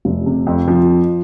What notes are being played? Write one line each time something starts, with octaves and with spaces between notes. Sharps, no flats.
F1
C3
F2
F3